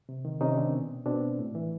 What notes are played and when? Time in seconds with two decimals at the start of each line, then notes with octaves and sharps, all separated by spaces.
0.09 C3
0.25 D#3
0.41 C3 C#4 D#4
0.57 D#3 C4 D4
0.73 B2
1.06 B2 C4 D4
1.39 A2
1.55 E3